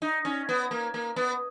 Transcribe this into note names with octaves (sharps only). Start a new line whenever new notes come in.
D#4
C#4
B3
A#3
A#3
B3